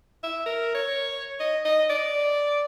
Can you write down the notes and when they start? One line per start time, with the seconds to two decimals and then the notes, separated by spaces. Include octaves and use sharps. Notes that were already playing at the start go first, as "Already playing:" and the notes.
0.23 E5
0.46 A#4
0.74 C#5
1.40 D#5
1.65 D#5
1.90 D5